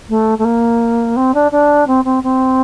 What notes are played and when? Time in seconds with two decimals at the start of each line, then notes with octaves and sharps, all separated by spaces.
0.09 A3
0.38 A3
0.44 A#3
1.16 C4
1.34 D4
1.52 D4
1.87 C4
2.05 C4
2.23 C4